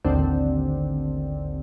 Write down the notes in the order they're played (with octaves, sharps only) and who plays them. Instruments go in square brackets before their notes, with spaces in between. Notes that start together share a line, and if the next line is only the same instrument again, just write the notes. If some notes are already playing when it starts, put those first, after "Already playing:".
[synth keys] A1 D#2 D3 C4 D4